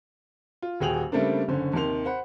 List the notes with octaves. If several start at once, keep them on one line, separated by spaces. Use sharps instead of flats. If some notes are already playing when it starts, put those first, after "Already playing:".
F4
D#1 F#4 G#4 G5 F7 F#7
C#3 G3 A3 A#3 C4 D4
F#1 D3 C#4 C5
D#2 C3 D#3 C6 F7
C5 F#5 B5